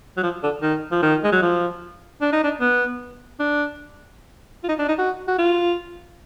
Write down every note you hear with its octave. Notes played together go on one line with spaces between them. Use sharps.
F#3
F3
D3
D#3
F3
D#3
G#3
F#3
F3
D4
D#4
D4
B3
D4
F4
D#4
D4
D#4
F#4
F#4
F4